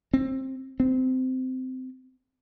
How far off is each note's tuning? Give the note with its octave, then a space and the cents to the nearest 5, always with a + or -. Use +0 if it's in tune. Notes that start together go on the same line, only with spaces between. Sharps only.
C4 +20
C4 -20